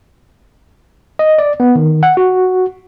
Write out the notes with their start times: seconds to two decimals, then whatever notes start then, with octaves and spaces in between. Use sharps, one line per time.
1.19 D#5
1.38 D5
1.60 B3
1.75 D#3
2.03 F#5
2.17 F#4